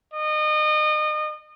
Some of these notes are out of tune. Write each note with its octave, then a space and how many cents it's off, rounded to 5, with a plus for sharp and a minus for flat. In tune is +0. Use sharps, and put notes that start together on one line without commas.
D#5 -30